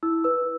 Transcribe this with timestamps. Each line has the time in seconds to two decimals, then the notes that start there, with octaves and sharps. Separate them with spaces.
0.03 E4 E6
0.24 B4 E6